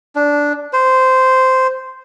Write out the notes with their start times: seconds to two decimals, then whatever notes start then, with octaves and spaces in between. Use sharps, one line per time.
0.15 D4
0.73 C5